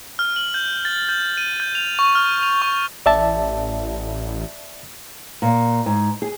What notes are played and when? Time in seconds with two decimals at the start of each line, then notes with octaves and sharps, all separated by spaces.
0.19 F6
0.36 F#7
0.54 G6
0.85 A6
1.09 G6
1.37 D#7
1.60 G6
1.75 F7
1.99 C#6
2.15 F6
2.43 F7
2.62 C#6
3.06 A1 D5 E5 A5
5.42 A#2
5.86 G#2
6.22 G#4